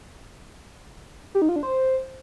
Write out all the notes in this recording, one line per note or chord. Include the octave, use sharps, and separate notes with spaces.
G4
D#4
F4
D4
C5